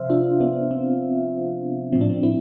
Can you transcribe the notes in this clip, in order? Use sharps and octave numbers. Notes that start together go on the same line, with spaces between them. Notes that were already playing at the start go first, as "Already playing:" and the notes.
Already playing: C3 F3 C5 E5 F5
D4 F4
B3 D4
C4
A2 F3 C4
D4
C4
C4 E4